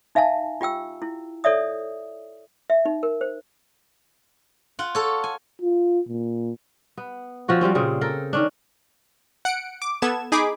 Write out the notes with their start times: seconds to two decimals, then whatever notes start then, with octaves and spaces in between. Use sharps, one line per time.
0.15 D#4 E5 F5 G#5 A5
0.61 F4 G4 G5 E6
1.02 E4
1.44 A4 C#5 D5 E5 D#6
2.70 E5
2.85 D#4
3.03 A#4
3.21 C5
4.79 F4 F#5
4.95 A4 C#5
5.24 G#5
5.62 F4
6.09 A#2
6.97 B3
7.48 F3 C4 F#4 C#5
7.61 F#3 G3 C4 C#4
7.75 A#2 C#3 C4 G#4
8.01 A4 A#4 G5
8.33 D#3 C#4 D4
9.45 F#5 C#7 D7
9.82 D6
10.02 B3 A4 G#6 E7
10.32 D#4 G#4 B5 D6